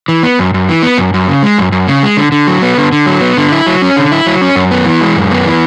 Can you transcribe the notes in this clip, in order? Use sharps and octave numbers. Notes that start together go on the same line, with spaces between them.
E3
B3
F#2
F#2
E3
B3
F#2
F#2
C#3
G#3
F#2
F#2
C#3
G#3
D3
D3
F#3
B3
D3
D3
F#3
B3
D3
E4
F#3
C#4
D3
E4
F#3
C#4
F#2
B3
E3
G#3
F#2
B3
E3